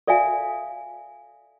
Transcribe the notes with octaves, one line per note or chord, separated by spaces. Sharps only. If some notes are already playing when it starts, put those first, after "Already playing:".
A4 D5 E5 F5 G#5